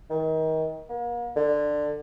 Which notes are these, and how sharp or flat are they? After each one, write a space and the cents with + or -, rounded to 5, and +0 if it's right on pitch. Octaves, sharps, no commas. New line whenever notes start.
D#3 +30
A#3 +40
D3 +10